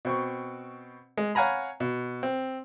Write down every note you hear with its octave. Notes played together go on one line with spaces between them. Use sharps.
B2 C4 C#6
G#3
C#5 F5 F#5 G#5 A#5 B5
B2
C4